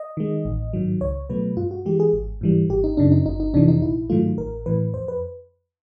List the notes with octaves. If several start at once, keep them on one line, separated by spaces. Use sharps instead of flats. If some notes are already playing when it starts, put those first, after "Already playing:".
Already playing: D#5
D#3 G#3
A1
G#2 D#3 F#3
C#2 C#5
B2 F#3 A3 B4
G2 F4
F#4
E3 G#3 G4
G#4
G#1
G#2 E3 G3
G#1 G4
D#4
F#2 C#3 D4
D#4
G1 D#4
D#4
F2 C3 E3 D4
D#4
A#1 E4
G#2 D#3 F#3 A3 F4
A1 A#4
A2 E3 B4
F2 C5
B4